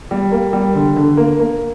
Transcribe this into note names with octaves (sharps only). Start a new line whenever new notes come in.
G3
A#3
G3
D3
D3
A#3
A#3